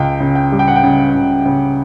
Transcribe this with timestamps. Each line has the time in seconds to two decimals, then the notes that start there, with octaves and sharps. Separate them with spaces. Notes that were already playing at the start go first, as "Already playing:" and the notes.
Already playing: C#2 G5
0.20 C#3
0.35 G5
0.52 G3
0.59 G5
0.68 F#5
0.76 G5
0.83 C#3
1.14 C#2
1.45 C#3